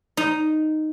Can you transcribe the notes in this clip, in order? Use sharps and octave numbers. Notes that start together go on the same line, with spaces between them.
D#4